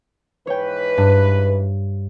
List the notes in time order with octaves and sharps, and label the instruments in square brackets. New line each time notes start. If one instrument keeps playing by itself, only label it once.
[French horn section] G#2 E3 B4 [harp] C#5 G5
[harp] G2